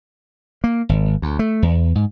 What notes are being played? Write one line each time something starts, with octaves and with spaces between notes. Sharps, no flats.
A#3
G#1
D2
A3
E2
G#2